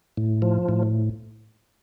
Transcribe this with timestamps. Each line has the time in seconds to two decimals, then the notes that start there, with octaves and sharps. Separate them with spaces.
0.17 A2
0.42 F3
0.69 A2